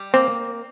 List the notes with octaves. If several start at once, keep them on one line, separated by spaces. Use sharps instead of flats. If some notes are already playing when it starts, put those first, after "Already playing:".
Already playing: G3
A#3 C4